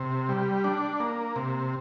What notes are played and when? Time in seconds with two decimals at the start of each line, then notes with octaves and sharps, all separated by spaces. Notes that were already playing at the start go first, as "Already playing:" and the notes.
Already playing: C3
0.29 G3
0.64 D4
1.00 A#3
1.36 C3